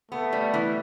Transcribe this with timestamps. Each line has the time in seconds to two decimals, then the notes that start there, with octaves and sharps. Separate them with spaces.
0.11 A3 B3
0.33 G3
0.54 E3